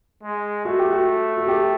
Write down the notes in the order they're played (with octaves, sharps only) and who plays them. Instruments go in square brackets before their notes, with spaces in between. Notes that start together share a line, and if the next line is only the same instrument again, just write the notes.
[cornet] G#3
[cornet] A3 [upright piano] F#4
[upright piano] G4
F#4
F#4
G4